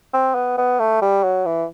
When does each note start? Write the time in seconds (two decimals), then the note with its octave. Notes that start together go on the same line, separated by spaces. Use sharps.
0.13 C4
0.35 B3
0.57 B3
0.79 A3
1.02 G3
1.23 F#3
1.45 E3